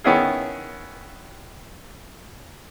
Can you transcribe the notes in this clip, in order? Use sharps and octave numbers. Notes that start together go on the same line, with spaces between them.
D#3 B3 C#4 E4 G#4